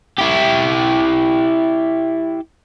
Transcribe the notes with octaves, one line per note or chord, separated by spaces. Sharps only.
E4 G4